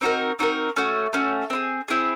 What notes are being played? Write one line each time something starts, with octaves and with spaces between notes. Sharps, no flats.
C4 D#4 F#4 A#4
C4 D#4 F#4 A#4
A3 C#4 F#4
A3 C#4 F#4
C4 E4 G#4
C4 E4 G#4